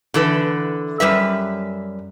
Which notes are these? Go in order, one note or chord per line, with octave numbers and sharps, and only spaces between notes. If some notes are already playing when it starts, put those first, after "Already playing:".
D3 E3 A4 B4
F#2 G3 B4 E5